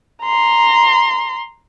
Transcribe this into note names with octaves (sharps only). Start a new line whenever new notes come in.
A#5 C6